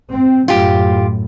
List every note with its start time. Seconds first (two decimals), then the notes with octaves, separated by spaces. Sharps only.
0.12 C4
0.48 F#2 A2 F4 G4